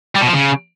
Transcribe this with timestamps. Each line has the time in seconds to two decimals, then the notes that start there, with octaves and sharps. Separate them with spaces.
0.15 G3
0.21 B2
0.27 F3
0.33 C#3